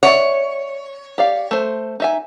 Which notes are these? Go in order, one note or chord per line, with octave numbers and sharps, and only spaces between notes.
C#5 D5 E5 F#5
G4 D5 F5
A3 C5
D#4 E5 G#5